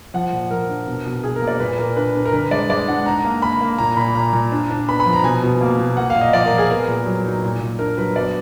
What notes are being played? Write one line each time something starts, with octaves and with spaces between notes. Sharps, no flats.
F3 F#5
A#2
F3 A#4
D4
B2
B2
B2 G#4
A#4
A#3
D5
A#2 B4
A#2 A#4
D4 B4
D4
A#4
D3 B4
G#3 D5
G#3 D5
D4 F#5
D#4 A#5
A#3
A#3 B5
A#3
A#2 A#5
A#2 B5
A#2 A#5
A#2
D4
D4
B3 B5
B5
F3
A#5
B2 G#5
B2
A#3
B2
A#3 F#5
F5
A#2
D#5
F3 D5
A#4
F3
G#4
B3 A#4
A#2
F#3
D#4
A#2
A#2
D4 A#4
F#3 B4
B3 D5